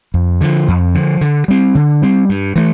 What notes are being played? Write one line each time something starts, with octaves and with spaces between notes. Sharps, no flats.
F2
D3 F3
F2
D3 F3
D3
G3 C4
D3
G3 C4
G2
E3 A3